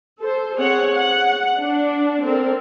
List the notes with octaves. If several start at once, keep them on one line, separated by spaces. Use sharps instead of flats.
A4 C5
C4 G#4 C#5 F#5
F#5
D4
C4 A4 A#4